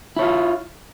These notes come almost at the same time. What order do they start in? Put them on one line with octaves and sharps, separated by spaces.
E4 C#5 F4